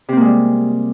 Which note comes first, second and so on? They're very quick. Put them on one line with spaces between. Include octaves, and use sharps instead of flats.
C3 C4 A#3 G#3 G3